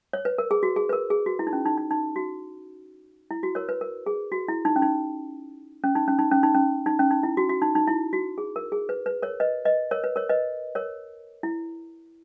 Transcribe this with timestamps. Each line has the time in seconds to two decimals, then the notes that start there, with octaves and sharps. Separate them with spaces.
0.13 C#5
0.25 B4
0.38 A#4
0.51 G#4
0.63 F#4
0.76 G#4
0.89 B4
0.93 A#4
1.10 G#4
1.26 F#4
1.39 E4
1.47 D#4
1.53 C#4
1.66 D#4
1.78 D#4
1.91 D#4
2.16 F#4
3.31 E4
3.43 F#4
3.55 A#4 C#5
3.69 B4
3.81 A#4
4.06 G#4
4.32 F#4
4.48 E4
4.65 D#4
4.76 C#4
4.82 D#4
5.84 C#4
5.95 D#4
6.08 C#4
6.19 D#4
6.31 C#4
6.43 D#4
6.55 C#4
6.86 D#4
6.99 C#4
7.11 D#4
7.23 E4
7.37 F#4
7.49 F#4
7.62 D#4
7.75 D#4
7.87 E4
8.13 F#4
8.38 G#4
8.56 A#4
8.72 G#4
8.89 B4
9.06 B4
9.22 A#4 C#5
9.40 B4 D#5
9.65 B4 D#5
9.91 A#4 C#5
10.04 B4
10.16 A#4 C#5
10.29 B4 D#5
10.75 A#4 C#5
11.43 E4